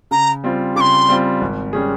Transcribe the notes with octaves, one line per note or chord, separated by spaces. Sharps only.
C#3 A#5
G3 C4 F4
C#3 C6 D6
G3 C4 F4
G#1
G3 C#4 G#4